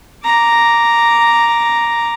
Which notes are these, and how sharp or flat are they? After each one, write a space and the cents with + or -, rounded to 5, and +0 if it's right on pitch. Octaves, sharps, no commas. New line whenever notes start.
A#5 +0 D6 -5